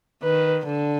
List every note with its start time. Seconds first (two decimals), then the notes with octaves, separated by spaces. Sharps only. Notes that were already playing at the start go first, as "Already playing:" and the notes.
0.23 D#3 B4
0.67 D3